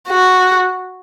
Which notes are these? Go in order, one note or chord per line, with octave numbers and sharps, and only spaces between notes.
F#4